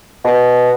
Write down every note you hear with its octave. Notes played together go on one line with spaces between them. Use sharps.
B2